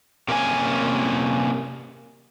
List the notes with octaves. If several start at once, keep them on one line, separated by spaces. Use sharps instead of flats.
C3 A#3 C#4 G#5